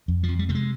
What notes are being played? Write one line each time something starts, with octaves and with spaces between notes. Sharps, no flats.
F2
F3
F2
G3
C3 A3
G#3